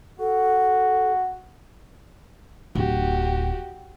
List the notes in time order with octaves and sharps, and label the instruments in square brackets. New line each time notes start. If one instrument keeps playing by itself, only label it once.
[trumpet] F#4 [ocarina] A4
[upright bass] D1 [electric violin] F#4 G4